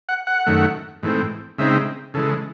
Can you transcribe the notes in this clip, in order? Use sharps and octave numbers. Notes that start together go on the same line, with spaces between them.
F#5
F#5
F#2 D#3 A3
G#2 E3 A3 C4
C#3 G#3 C4 D#4 E5
C#3 E3 G#3 A4